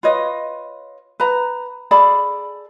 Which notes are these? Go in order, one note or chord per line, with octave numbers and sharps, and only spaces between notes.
F4 B4 C#5 D#5
B4 A#5
G#4 A4 D5 B5